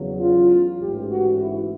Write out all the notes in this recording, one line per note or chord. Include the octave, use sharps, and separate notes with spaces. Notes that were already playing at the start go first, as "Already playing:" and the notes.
Already playing: E2 C#3 F#3
F4
A1 G#2 E3 G4
F#4
E4